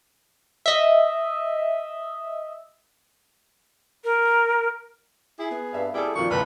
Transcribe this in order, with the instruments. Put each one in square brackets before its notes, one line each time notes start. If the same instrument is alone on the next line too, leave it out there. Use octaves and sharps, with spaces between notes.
[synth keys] D#5 E5
[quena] A#4
[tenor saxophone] E4 [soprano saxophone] G#4
[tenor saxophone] B3
[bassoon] G2 [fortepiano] E5 F5
[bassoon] G3 [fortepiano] E4 G#4 A4 [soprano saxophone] G5
[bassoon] A#2 [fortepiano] D#3 F3 [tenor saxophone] F#4 [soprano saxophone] C#6
[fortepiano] G#1 D2 A2 [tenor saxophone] B4 [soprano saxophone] F5